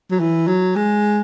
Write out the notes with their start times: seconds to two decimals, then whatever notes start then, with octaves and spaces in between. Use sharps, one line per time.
0.11 F#3
0.20 E3
0.47 F#3
0.76 G#3